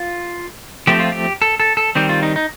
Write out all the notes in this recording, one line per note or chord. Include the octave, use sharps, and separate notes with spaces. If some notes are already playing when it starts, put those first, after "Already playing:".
Already playing: F4
F3 A3 C4 G4
F4
G4
A4
A4
A4
D#3 G3 C4 G4
F4
D#4
D#4